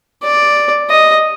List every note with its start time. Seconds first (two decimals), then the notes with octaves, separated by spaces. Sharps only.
0.24 D5
0.90 D#5